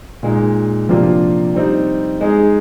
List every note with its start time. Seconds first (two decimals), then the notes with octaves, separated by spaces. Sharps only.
0.23 A#2 G#3 D#4
0.89 C3 F3 A#3 D4 F4
1.55 G3 C4 D#4
2.21 G#3 D#4 G#4